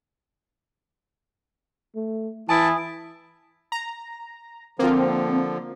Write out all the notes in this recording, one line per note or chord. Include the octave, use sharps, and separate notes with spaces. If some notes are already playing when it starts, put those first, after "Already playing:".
A3
E3 E4 G#5 A5 D#6 D7
A#5
D3 F3 A#3 C4 F4